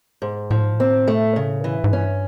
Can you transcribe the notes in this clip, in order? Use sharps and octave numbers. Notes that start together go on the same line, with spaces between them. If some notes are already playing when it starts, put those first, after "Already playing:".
G#2
A2 F3
G#2
A2
C4
A3
C#3
E3
G#2
G2 C#4